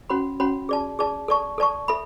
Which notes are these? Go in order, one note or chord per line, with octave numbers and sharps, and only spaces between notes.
C#4 F#4 C#5 F#5 B5
C#4 F#4 C#5 F#5 B5
G#4 D5 A5
G#4 D5 A5
A4 D5 A5 C#6
A4 D5 A5 C#6
A4 E5 B5